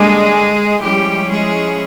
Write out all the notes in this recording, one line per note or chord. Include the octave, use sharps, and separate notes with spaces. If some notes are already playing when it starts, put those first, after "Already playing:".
Already playing: D3 G3 G#3 A#3 D4 G#4
F3 G3 G#3 C#4 E4 G4
G#3 G#4